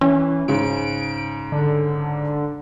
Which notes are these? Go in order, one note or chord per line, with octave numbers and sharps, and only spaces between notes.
E3 C#4
G#2 C#3 D7
D3